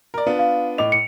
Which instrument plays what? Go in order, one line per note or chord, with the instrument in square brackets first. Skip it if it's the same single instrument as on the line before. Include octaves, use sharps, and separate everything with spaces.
[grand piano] A#4 D5
B3 D4 F4
[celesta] F5
[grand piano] A2 D6 F7 [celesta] D#5
[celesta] C#7